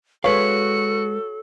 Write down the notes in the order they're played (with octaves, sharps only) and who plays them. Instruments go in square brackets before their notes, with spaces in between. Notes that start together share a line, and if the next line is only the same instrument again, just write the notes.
[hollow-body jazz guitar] G#3 B4 F5 [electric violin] F#4 C#7 [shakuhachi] A4 [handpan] C#5